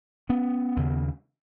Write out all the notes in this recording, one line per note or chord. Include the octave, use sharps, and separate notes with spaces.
B3 C#4
D#2 C#3